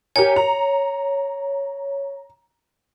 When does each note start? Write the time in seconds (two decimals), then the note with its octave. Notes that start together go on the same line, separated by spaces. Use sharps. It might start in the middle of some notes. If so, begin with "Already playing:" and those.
0.16 G4 A#4 C#5 G#5
0.36 A#5